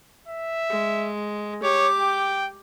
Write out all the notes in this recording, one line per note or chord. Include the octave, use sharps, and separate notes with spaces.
E5
G#3
G4 C#5 D6
G5